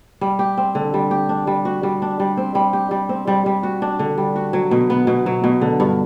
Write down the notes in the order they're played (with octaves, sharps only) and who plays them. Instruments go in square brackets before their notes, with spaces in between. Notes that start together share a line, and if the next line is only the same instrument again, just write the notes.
[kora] G3
G4
C4
D3
G3
G4
D4
G3
F#4
G3
D4
G3
C4
G3
G4
G3
C4
G3
G3
F#4
D4
D3
G3
F#4
F#3
B2
B3
B2
F#3
B2
D3
G2